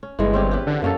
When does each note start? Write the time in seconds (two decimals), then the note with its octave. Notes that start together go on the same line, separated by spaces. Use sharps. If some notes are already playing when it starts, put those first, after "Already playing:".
0.03 C#4
0.19 G1 E3 G#3
0.33 C4 C#4 G4
0.51 G4 B4
0.67 D3
0.82 F#2 A#3 C#4 A4